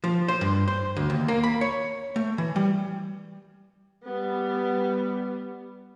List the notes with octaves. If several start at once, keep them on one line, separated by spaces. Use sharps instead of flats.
F3
C5
G2
C5
D2
D#2
A#3
B5
C#5
A3
E3
G3
G3 B3